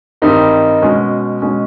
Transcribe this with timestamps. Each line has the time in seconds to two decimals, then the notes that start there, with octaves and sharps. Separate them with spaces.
0.22 G2 D#3 G3 C4 D#4
0.82 B2 G#3 C#4
1.42 B2 G#3 C#4